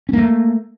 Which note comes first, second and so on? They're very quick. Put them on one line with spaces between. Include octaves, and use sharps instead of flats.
C#4 A#3 A3